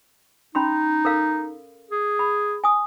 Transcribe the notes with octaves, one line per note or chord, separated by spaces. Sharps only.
C#4 D#4 B5 C6
A4 A#4 F5
G#4
B5
G#5 D#6